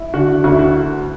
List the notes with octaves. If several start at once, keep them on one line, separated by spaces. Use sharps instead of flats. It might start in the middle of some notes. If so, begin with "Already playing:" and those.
Already playing: E4
D3 F#4
D2 F#4
E4
F#4